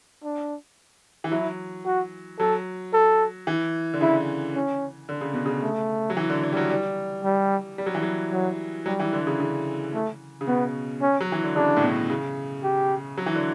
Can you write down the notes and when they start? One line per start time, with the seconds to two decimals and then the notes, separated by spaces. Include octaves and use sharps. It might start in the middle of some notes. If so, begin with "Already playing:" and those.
0.24 D4
1.24 E3
1.31 F#3 E4
1.85 F#4
2.39 F#3 A4
2.93 A4
3.47 E3
3.94 D3
4.01 C#3 E4
4.55 C#4
5.09 D3
5.21 C#3
5.33 B2
5.46 C#3
5.62 A3
6.10 F#3
6.17 E3
6.30 D3
6.43 D3
6.52 G3
6.57 F#3
6.70 G3
7.24 G3
7.78 G3
7.86 F#3
7.95 E3
8.03 F#3
8.32 F#3
8.86 F#3 G3
9.00 E3
9.13 D3
9.27 C#3
9.40 C#3
9.94 A3
10.41 C#3
10.47 B2 B3
11.01 C#4
11.21 F#3
11.32 E3
11.44 D3
11.55 C#3 D4
11.77 A2
11.82 B2
12.10 C#3
12.63 G4
13.18 F#3
13.26 E3
13.36 D3